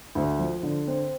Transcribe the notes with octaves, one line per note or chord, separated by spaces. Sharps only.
D2
F3
D3
C4